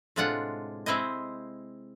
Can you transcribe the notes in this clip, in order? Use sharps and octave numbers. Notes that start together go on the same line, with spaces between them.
A2 C3 G#3 D4 F4 F#5
G#3 C4 E4 C5 D#5